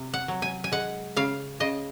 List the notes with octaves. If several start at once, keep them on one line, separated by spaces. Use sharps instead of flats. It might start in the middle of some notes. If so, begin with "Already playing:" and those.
Already playing: C3
F#5
F#3
G#5
G#5
G#3 F#5
C#3 F5
C#3 D#5